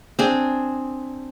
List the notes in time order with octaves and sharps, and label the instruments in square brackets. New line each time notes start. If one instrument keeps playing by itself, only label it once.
[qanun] C4 D4 G#4